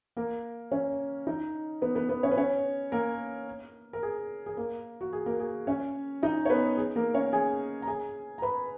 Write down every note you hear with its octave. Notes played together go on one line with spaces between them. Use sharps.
A#3 A#4
C#4 C#5
D#4 D#5
B3 B4
B3 B4
B3 B4
C#4 C#5
B4
C#4 C#5
A#3 A#4
A#4
G#4
G#4
A#3 A#4
F#4
G#4
A#3 A#4
G#4
C#4 C#5
D#4 D#5
C#5
B3 B4
G#4
A#3 A#4
C#4 C#5
G#4 G#5
A#5
G#4 G#5
A#5
B4 B5